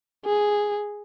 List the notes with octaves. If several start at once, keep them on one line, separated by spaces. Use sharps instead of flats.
G#4